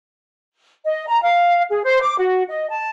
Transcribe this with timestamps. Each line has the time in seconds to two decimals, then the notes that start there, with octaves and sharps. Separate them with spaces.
0.85 D#5
1.07 A#5
1.22 F5
1.69 G#4
1.84 C5
2.01 D6
2.18 F#4
2.48 D#5
2.70 A5